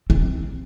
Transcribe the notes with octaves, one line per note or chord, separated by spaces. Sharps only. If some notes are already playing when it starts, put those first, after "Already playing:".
C4